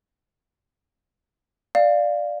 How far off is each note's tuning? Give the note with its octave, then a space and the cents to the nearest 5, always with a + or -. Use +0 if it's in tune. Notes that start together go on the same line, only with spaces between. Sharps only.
D5 +10 F5 +0